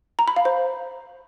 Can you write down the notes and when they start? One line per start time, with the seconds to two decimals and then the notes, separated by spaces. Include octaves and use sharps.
0.19 A#5
0.28 B5
0.36 F5
0.45 C5